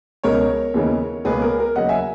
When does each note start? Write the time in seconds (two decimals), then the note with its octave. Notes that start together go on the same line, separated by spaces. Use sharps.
0.24 C#2 B2 G#3 C#4 A#4 C#5
0.74 D#2 C#3 E3 G#3 B3
1.25 C#2 B2 A#3 G#4 B4
1.41 A#4
1.59 A#4
1.76 D#2 C#3 F#3 D#5 F#5
1.89 E5 G#5